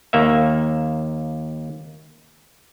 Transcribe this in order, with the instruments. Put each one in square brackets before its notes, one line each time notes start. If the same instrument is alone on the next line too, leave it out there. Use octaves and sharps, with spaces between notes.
[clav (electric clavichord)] D#2 A#3 E5